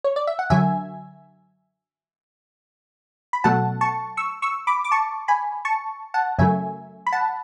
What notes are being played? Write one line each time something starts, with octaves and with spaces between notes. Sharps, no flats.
C#5
D5
E5
F#5
F#2 D3 F#3 E5 G#5
B5
B2 F#3 A3 F#5 A5
A5 C#6
C#6 E6
C#6 E6
B5 D6
D6
A5 C#6
G#5 B5
A5 C#6
F#5 A5
F#2 C#3 F#3 A3 E5 G#5
B5
F#5 A5